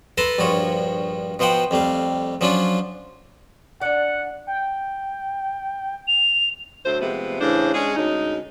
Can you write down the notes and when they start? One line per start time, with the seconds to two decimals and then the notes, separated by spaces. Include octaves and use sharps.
0.18 A4 B4 A5 A#5 C6
0.39 A#1 G2 F3 F#4 C#5
1.39 B2 F3 C5 F#5 G5
1.71 F2 G3 A3 F5
2.41 F3 F#3 C#4 D4 F4
3.81 D4 D5 F#5
4.47 G5
6.08 F7
6.85 D2 F#3 A3 C5
7.01 C3 F3 G#3 A3 B3
7.41 A2 C#3 E3 D4 C5
7.74 G#3 C#4 D4 G#4
7.96 D2 G#3 C#4 D#4